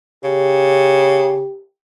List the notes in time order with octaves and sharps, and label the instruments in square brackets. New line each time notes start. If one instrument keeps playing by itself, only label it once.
[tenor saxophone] C#3 [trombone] G4